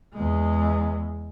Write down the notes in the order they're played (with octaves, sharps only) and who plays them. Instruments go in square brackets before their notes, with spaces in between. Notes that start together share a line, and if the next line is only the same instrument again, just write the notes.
[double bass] E2 G#3